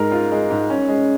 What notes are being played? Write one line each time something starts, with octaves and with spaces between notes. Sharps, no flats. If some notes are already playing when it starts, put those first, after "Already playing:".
Already playing: G#2 G#3 A#4
F4
G#3
G#2
C#4
G#3